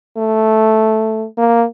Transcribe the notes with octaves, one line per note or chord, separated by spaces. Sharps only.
A3
A#3